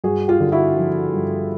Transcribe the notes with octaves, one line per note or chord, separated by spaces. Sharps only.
G2 F#4 G#4
F4 G4
D3
E4 F#4
F3
G2